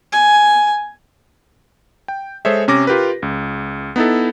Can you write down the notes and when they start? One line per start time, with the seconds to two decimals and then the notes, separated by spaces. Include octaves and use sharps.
0.12 G#5
2.08 G5
2.45 G#3 G#4 A4 C5 C#5 E5
2.68 C3 C#4 D6 A#6
2.87 F4 G4 A#4 B4
3.22 C#2
3.96 B3 D#4 E4 A4